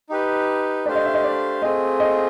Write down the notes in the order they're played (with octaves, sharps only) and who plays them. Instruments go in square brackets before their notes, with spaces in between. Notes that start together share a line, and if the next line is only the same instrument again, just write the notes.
[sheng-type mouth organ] D#4 G4 B4
[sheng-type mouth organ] A3 D4 G4 C5 F5 [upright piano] D5
[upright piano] D#5
E5
D#5
D5
[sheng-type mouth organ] A3 C4 F4 G#4 [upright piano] D#5
[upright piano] D#5